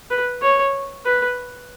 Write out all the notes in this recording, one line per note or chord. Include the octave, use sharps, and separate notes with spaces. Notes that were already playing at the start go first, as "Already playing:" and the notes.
B4
C#5
B4